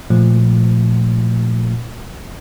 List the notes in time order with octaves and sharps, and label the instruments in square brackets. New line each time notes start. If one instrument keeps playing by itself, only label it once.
[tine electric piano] A#2 F3 A3